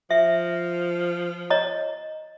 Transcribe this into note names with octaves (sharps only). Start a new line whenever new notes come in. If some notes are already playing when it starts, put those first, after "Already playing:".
F3 E5
C#5 D#5 A#5